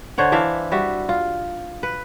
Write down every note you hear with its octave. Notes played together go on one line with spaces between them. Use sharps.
D3 C5 C#5 F#5
E3 D4 E5 F5
G3 F#4 E5
F4
B4